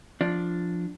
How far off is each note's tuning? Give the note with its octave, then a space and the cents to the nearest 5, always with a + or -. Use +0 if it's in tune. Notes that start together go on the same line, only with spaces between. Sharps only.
F3 +0 D4 +0